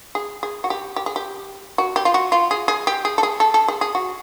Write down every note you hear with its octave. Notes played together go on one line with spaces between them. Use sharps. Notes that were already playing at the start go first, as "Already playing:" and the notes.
G#4
G#4
F#4
G4
G4
G#4
G4
F#4
G4
F4
F#4
F4
G#4
G#4
G4
G#4
A4
G#4
A4
A4
G#4
G#4
F#4